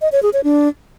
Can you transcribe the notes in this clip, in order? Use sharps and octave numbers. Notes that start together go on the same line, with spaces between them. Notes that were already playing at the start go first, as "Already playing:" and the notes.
D#5
C#5
G#4
C#5
D4